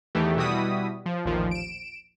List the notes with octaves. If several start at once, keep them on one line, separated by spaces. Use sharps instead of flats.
E2 D#3 E3 A3 G4
B2 G3 E4 F#4 D#6 B6
F3
A1 D#2 A#2 F3
D7 E7